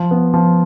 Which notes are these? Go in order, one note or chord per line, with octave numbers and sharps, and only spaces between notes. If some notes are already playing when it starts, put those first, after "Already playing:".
Already playing: F3
B3
F3